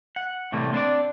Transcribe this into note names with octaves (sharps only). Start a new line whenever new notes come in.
F#5
A2 C3 E3 G3 A3 A#3
C4 D4 C5 D5